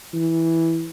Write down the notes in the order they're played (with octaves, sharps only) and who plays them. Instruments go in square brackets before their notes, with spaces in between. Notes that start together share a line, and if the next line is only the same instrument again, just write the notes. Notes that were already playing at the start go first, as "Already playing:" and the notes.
[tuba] E3